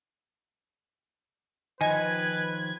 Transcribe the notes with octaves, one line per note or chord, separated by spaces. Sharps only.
D#3 F3 B4 D#5 G#5 G#6